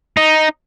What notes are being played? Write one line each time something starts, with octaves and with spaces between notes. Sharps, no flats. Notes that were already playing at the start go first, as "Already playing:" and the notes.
D#4